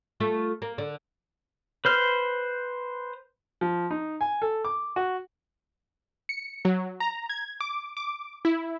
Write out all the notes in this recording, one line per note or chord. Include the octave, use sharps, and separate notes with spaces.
A3 F4 E5
A#3
D3
B4 C5 F6
F3
D#4
G#5
A4
D6
F#4
C#7
F#3
A#5
G#6
D6
D6
E4